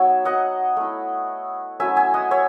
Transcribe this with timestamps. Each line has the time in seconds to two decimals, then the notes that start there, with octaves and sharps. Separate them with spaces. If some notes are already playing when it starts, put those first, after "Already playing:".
Already playing: F#3 B3 D#4 C#5 E5
0.25 D#5 F#5
0.77 A3 E4
1.80 F#3 A3 C#4 E4 E5 G#5
1.97 E5 G#5
2.14 D#5 F#5
2.31 C#5 E5